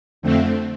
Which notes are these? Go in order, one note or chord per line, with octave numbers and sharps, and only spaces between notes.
F2 D3 A3 C4